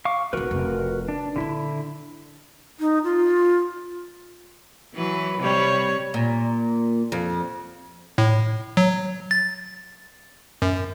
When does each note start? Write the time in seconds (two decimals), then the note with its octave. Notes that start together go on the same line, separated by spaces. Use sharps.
0.05 F5 C#6 D6
0.33 D#1 D#4 F#4 A#4 B4
0.51 F1
1.09 D4
1.36 A#2 D3 D#3 E4
2.79 D#4
3.04 F4
4.94 E3 F#3 B4
5.41 C3 G3 C#5
6.14 A#2
7.12 F2
8.18 A2
8.77 F#3
9.31 A6
10.62 F#2